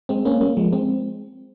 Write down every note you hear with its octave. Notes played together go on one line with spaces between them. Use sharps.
G#3 C4
A#3 C#4
G3 A#3
F3 G#3
G#3 C4